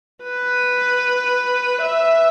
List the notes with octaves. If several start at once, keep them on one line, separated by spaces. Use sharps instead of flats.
B4
E5